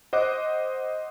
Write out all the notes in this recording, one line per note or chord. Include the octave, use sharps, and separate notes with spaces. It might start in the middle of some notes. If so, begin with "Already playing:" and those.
C5 D#5 F#5 D6 F#6